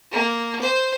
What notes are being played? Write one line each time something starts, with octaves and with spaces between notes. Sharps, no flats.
A#3
C5